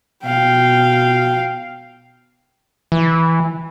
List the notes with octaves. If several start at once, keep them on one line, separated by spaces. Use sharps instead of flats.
B2 F5 G5
E3